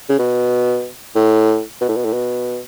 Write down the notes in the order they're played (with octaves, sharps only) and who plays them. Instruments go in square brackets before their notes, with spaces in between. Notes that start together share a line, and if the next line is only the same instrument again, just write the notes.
[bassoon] C#3
B2
A2
B2
A2
B2
A2
B2